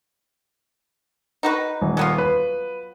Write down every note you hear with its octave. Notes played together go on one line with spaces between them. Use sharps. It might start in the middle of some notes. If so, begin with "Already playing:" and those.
D#4 F#4 B4
D#1
F#3 B3 F4
B4